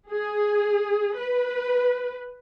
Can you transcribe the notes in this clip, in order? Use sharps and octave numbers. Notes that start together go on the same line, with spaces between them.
G#4
B4